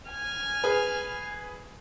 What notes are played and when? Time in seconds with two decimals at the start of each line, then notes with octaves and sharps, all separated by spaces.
0.10 G#5 F6
0.64 G#4 B4